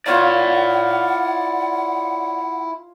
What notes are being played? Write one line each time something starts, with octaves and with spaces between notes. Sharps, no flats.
E4 F4 C#5 D5 F5 F#5 A5